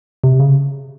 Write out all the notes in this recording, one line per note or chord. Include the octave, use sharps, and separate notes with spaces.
C3
C#3